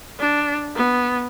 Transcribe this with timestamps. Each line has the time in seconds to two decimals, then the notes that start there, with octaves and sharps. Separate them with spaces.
0.20 D4
0.75 B3